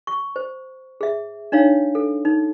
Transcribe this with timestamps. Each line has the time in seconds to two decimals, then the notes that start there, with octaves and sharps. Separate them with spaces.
0.07 C#6
0.36 C5
1.01 G#4 E5
1.52 D4 D#4 C#5 F5
1.95 A4
2.25 D#4